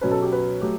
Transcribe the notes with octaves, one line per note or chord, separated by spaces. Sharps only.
B2 F#3 C#4 B4
A4
G4
B4
F#3 A3 G4